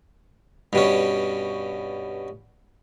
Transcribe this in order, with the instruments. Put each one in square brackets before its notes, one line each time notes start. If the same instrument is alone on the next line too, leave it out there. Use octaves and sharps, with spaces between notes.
[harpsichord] G2 B2 C#4